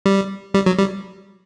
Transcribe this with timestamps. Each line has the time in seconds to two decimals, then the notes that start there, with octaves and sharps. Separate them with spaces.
0.06 G3
0.54 G3
0.66 F#3
0.78 G3